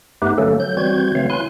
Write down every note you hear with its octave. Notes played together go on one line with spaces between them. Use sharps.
G2 A3 B3 D#4 G4 B4
D3 F#3 A3 A#3 C#4 A4
F#3 G6
E3 G3 C4 F#4 G6 G#6
C#3 E3 F#3 A3 C4 F5
E4 G#5 C6 F#6